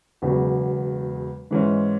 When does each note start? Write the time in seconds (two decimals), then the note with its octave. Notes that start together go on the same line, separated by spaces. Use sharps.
0.22 E1 E2 C#3 F#3
1.51 G#2 E3 G#3 C#4